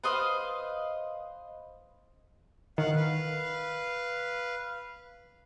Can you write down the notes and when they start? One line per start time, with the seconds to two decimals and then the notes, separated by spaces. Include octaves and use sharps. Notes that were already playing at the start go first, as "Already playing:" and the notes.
0.04 B4 C5 D#5 F5
2.78 D#3 F5 F#5
2.95 B4 F5